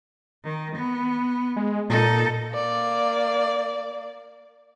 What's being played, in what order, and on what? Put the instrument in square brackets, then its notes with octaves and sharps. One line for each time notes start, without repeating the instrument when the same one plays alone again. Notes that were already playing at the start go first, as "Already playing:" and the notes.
[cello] D#3
B3
[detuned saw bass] G#3
[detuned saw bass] A#2 [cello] D#4 A4
[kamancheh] A#3 D5